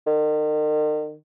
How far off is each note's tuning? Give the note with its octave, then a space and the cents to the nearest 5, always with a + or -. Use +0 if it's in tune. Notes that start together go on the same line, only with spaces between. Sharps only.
D#3 -40